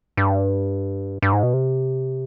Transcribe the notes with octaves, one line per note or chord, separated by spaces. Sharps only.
G2
G2
G#2
B2
C3